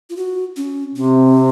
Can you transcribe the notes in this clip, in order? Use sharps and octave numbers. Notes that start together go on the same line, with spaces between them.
F4
F#4
C#4
C3 C4